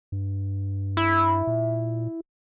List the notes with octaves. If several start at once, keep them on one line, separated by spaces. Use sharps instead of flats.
G2
E4
A#2